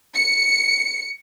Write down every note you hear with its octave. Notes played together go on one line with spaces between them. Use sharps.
C#7